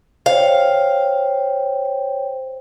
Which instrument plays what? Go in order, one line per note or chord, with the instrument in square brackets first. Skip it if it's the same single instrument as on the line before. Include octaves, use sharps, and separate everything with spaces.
[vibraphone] C5 C#5 G5 [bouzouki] F5